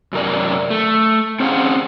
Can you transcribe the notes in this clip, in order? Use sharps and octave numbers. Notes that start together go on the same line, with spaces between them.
F#2 C3 A#4 D5
A3
C4 C#4 G#4 F5 F#5